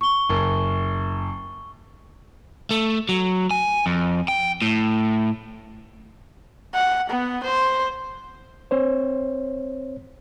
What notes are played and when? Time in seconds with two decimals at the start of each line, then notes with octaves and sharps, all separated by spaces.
0.01 C#6 G7
0.29 F#1
2.71 A3
3.09 F#3
3.51 G#5
3.86 F2
4.28 G5
4.62 A2
6.74 F#5
7.10 B3
7.43 C5
8.71 C4 C5 C#5